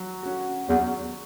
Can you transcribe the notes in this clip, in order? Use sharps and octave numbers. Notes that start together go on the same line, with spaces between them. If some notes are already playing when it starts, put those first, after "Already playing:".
Already playing: F#3
C#4 F#4
E2 F#3